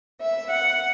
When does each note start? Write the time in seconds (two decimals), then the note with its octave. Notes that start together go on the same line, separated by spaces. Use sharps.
0.20 E5
0.50 F#5